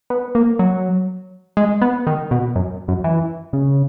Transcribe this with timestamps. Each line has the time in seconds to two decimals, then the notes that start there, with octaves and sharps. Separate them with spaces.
0.10 B3
0.35 A#3
0.59 F#3
1.57 G#3
1.82 B3
2.07 D#3
2.31 B2
2.56 F#2
2.88 F#2
3.04 E3
3.53 C#3